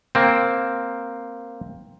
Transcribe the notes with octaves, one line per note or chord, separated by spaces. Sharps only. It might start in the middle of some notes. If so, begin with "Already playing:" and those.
A#3 C4